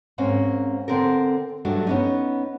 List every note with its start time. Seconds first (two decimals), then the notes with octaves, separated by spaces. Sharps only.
0.18 G#2 A#3 C4 C#4
0.88 D3 C4 A4 A#4
1.65 G2 F#3 A3 D4
1.87 B3 C#4 D#4